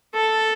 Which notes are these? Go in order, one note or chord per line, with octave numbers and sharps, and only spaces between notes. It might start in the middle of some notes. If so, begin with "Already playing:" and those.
A4